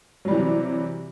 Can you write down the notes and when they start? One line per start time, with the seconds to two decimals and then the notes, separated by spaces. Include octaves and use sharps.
0.25 F#3
0.28 G3
0.31 E3
0.34 C3